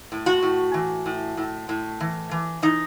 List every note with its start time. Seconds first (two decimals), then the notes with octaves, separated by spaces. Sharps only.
0.12 A2
0.26 F#4
0.43 A2
0.74 E3
1.06 A2
1.37 A2
1.69 A2
2.00 E3
2.31 E3
2.62 E3 D#4